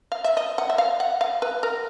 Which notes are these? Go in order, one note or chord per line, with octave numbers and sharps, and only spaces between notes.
F5
E5
D#5
F#5
E5
F5
F#5
F5
B4
A#4